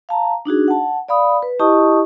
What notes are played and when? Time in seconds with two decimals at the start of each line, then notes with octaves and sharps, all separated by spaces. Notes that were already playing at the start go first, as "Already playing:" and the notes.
0.09 F5 A5 A#5
0.45 D4 D#4 F#4 G#4
0.68 F#5 A5
1.08 D5 F5 B5 D#6
1.43 B4
1.59 E4 G4 D#5 A5 C#6 D#6